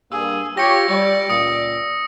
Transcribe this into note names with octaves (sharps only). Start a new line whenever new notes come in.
G2 A#3 G#4 E6
F4 G4 C#5 A#6 C#7
G3 D5
C#2 A#2 D#6 C#7